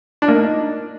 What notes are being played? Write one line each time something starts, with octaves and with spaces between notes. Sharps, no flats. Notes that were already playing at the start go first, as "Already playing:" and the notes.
D4
A#3
D#4